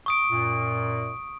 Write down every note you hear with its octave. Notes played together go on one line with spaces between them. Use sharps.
C#6 D#6 D7
F#2 A#2